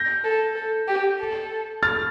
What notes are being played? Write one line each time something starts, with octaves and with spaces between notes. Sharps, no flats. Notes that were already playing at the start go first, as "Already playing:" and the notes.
Already playing: G6 A#6
A4
A4
G4
A4
F6 A6